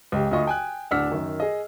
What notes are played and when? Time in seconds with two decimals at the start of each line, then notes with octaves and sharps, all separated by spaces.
0.12 C#2 G4
0.31 D2 F4 D#5 C#6 D#6
0.47 G5 G#5 F#6
0.91 D1 D4 F#5 E6 F6 B6
1.11 F#2 D#3
1.40 G#4 D#5